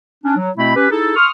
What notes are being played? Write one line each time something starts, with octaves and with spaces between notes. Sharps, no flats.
C#4 D4
F#3
B2 A3 C4 E4 B5
C#4 G4 B4
D#4 E4 G#4 A4
C6 C#6 D#6 F6